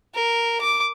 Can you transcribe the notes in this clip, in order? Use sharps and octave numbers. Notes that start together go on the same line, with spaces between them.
A#4
D6